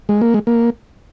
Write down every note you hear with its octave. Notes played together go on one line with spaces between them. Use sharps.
G#3
A#3
G#3
A#3